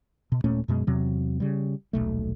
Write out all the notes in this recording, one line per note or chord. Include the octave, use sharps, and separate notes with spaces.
B2
D#1 A#2 A3 C#4
F#2 B2 G#3
E2 C3 F#3
C#3 G3
D#1 B1 A3